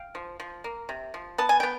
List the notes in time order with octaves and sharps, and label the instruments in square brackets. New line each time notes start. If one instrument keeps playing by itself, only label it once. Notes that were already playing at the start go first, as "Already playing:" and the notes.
Already playing: [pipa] F5 G5
F3
F3
A#3
C3
F3
B3 A5
G#5
B3 G5